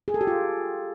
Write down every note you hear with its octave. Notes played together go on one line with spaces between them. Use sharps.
G#4
A4
G4
F4